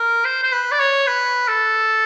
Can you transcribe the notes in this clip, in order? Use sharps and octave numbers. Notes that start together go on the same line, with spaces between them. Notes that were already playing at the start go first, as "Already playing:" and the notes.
Already playing: A#4
C5
C5
B4
D5
C#5
B4
A4